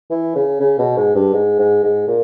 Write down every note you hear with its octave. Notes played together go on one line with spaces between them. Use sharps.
E3
C#3
C#3
B2
G#2
G2
G#2
G#2
G#2
A#2